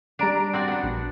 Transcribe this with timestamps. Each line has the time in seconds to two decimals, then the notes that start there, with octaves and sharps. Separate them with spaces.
0.19 G3 D4 A#5 D7
0.53 C4 F#4 D5
0.68 B3 D4
0.83 A#1